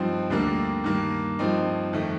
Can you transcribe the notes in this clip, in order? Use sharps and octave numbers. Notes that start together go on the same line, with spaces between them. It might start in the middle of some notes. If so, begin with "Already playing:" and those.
Already playing: G2 F3 C4 D#4
D2 D3 G3 A#3 D4
G2 D#3 A#3
G2 F3 C4 D#4
F2 D#3 A3